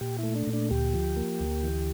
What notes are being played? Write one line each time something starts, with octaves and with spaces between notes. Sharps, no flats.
A#2 G4
A3 E4
D4
A#2
D4
D2 G4
F3
A#3
D2
E3